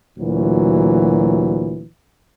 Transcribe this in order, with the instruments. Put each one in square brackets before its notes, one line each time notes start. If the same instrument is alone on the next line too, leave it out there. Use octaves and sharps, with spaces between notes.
[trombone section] D2 A#2 E3 F#3